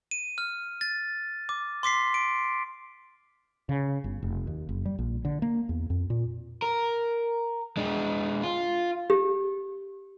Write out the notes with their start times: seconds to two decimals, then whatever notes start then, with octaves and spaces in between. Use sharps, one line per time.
0.11 D#7
0.38 F6
0.81 A6
1.49 D6
1.83 C6 D6 B6 C7
2.14 D7
3.69 C#3
4.04 G1
4.23 F1
4.47 D#2
4.69 F#1
4.85 G3
4.99 A#1
5.25 D3
5.42 A#3
5.69 E2
5.90 F2
6.10 A#2
6.62 A#4
7.77 G#3 D4
8.43 F4
9.10 G4